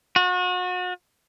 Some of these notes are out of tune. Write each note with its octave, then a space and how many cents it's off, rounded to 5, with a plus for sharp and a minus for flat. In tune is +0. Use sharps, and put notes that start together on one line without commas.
F#4 -35